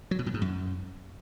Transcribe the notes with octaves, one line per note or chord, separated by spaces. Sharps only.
F#3
B2
A2
G#2
F#2